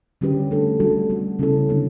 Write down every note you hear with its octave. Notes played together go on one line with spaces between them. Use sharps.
D3 G3 C#4 G4 B4
A3 D4 A4
G3 D4 F#4 A4
G3 B3 F#4
C#3 G3 C#4 E4 A4
D3 F#3 B3 D4